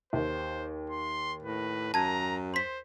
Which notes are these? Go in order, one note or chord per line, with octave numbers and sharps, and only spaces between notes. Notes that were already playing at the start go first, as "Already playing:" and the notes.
D#2 C5
C6
A2 B4
F#2 A5 A#5 G#6
C5 C6 B6